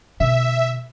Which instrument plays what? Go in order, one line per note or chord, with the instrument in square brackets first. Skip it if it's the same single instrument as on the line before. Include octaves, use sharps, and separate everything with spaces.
[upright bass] B2 D3 [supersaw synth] E5